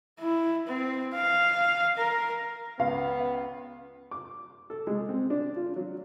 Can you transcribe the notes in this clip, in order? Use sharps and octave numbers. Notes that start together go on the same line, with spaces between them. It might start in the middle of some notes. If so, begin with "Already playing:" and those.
E4
C4
F5
A#4
C#2 B3 F5
D6
A4
G#3
C4
D4
F4
F#3